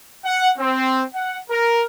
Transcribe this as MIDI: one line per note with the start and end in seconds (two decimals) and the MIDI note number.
0.25 0.49 78
0.58 1.02 60
1.14 1.37 78
1.50 1.82 70